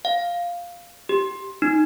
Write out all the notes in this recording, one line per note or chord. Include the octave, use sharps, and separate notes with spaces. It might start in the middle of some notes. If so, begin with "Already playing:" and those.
F5
G4
D#4